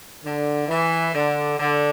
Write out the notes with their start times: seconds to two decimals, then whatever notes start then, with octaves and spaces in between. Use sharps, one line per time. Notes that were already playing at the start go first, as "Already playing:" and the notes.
0.24 D3
0.68 E3
1.13 D3
1.58 D3